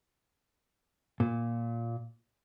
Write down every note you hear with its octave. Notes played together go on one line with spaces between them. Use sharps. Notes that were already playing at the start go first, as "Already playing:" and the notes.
A#2